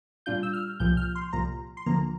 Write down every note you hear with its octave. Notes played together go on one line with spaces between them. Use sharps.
A#2 G3 D4 F4 G6
E6
F6
C2 A#2 F3 G6
F6
C6
C2 A#2 F3 A#5
C6
D2 D3 F3 A#3 A#5